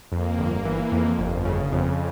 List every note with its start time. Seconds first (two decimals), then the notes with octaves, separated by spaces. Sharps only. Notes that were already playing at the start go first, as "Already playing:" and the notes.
0.11 F2 A#3
0.38 G1
0.65 E3
0.92 F2
1.19 G1
1.45 C#3
1.72 F2